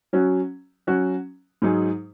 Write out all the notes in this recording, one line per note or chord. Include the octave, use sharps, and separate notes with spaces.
F#3 C#4 F#4
F#3 C#4 F#4
G#2 F#3 D#4 G#4